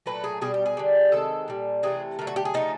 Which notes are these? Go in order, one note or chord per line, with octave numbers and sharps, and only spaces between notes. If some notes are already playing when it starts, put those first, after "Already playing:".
A#2 F#3 A3 B4
G#4
B2 G3 G#4
G4
G#4
D3 G3
C3 D#3 G#3 A4
A#2 G3
C3 E3 A3 G#4
D3 F#3 A3 A#4
F#4
G4
G#4
C#3 F3 A3 D#4